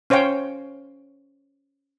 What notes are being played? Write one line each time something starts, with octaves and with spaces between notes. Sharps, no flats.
C#4 C5 C#5 F5 G5